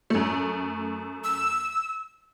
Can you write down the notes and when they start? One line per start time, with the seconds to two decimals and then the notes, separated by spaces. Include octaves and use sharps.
0.10 F#2 A3
1.24 E6